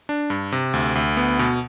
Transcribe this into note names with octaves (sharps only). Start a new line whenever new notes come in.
D4
G2
C3
D2
D2
B3
B2